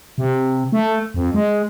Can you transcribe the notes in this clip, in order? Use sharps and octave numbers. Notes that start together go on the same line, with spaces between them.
C3
A3
F2
G#3